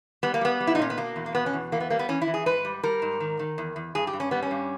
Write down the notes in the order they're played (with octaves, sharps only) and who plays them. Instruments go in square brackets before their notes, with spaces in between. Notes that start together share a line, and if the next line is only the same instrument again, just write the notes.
[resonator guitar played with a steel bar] G3 B3
A#3
G3 B3
G3
E4
D#4
A#2 C#4
B3
B2 A#3
E2
A#3
B2 B3
C#4
E2
E3 A#3
B3
G3 A#3
B3
E3 C#4
E4
E3
G#4
G#2 B4
G3
G3 A#4
G#2
D#3
D#3
E2
E2
G2 G#4
G4
G2
C#4
G3 B3
C#4
G2